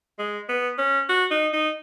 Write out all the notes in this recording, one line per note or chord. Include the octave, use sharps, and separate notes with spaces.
G#3
B3
C#4
F#4
D#4
D#4